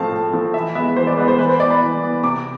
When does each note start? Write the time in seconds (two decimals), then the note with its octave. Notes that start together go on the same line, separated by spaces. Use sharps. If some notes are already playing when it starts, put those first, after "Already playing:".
Already playing: A2 F3 A3 C4 F5 A5
0.12 A2
0.33 F3 A3 C4
0.54 E3 E5
0.75 G#3 B3 E5
0.96 E3 C5
1.07 D5
1.17 G#3 B3 B4
1.28 C5
1.39 E3 B4
1.49 C5
1.60 B3 D5
1.70 B5
1.81 E3
2.02 B3
2.23 C3 D6